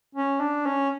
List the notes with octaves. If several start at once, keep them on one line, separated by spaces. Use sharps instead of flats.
C#4
D4
C#4